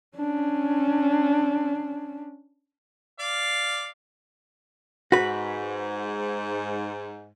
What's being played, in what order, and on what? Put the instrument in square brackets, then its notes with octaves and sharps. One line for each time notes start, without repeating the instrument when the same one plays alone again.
[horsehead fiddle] C#4 D4
[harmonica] D5 F5
[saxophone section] G#2 [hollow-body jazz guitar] F#4 B4